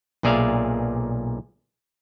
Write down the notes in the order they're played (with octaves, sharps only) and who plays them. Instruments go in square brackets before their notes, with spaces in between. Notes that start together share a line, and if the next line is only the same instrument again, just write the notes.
[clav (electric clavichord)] B1 A#2 G#4 D5 E5 F5